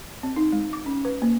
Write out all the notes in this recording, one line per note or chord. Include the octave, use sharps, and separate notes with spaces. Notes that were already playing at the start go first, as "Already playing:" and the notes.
C4
D#4
G#3
D6
C#4
B4
A#3